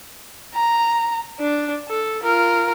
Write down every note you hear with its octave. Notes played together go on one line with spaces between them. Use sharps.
A#5
D4
A4
F4 A#4